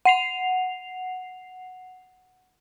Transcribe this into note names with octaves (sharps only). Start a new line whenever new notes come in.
F#5 C7 F7